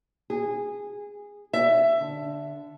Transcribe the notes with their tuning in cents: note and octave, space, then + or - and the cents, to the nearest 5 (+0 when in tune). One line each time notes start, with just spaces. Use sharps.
G#4 -15
E5 +15
D3 -5